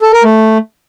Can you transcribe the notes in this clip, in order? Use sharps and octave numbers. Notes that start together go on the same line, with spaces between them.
A4
A#4
A3